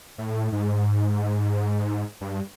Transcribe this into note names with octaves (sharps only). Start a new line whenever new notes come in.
A2
G#2
G2